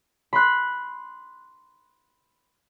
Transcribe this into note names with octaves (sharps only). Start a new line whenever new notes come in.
B5 C6 F#6